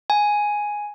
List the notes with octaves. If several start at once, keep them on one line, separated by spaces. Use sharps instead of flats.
G#5